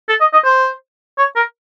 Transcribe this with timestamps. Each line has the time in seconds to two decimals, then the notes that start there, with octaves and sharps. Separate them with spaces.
0.09 A4
0.20 D#5
0.33 D#5
0.45 C5
1.18 C#5
1.36 A#4